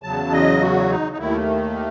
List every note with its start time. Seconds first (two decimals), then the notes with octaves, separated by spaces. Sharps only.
0.03 E2 C#3 F#3 A5
0.32 D#5
0.61 F#4
0.90 D#4
1.12 D#4
1.18 D#2 D#3 A3 E4